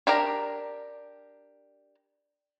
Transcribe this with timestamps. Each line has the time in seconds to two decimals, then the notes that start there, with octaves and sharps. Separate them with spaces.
0.07 D4 G4 A#4 A#5